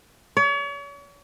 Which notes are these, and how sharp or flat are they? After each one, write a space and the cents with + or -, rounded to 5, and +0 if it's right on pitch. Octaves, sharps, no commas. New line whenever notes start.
C#5 +40